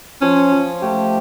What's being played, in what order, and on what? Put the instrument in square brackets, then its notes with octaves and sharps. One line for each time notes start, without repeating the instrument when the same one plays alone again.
[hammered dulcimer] F3 [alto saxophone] C#4
[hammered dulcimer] F3
[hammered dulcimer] A3 [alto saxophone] G4